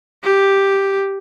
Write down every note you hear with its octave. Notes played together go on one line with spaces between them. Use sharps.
G4